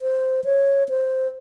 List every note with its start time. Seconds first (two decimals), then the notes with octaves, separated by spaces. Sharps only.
0.02 C5
0.44 C#5
0.89 C5